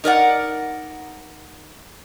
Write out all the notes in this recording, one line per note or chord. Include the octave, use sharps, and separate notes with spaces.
D#4 A#4 D5 F#5